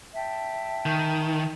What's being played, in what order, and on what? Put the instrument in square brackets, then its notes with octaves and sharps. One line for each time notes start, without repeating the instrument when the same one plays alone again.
[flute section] E5 G5 A5
[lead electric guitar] D#3